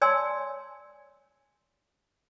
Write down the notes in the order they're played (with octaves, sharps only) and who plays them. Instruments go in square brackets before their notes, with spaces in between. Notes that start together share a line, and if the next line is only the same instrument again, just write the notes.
[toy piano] C#5 D5 G#5 A5 C6 E6